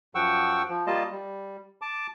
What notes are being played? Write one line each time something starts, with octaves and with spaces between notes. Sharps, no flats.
F#2 F3 F#5 G5 C#6 E6
F3
G3 A#3 F4 D#5 A5
G3
A5 D6